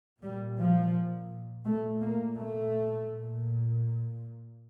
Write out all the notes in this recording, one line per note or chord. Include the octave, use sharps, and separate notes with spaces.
A#2 G3
F3
A#2 A3
A#3
A3
A#2